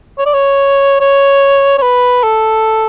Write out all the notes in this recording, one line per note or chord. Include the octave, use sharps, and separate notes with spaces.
C#5
D5
C#5
C#5
C#5
B4
A4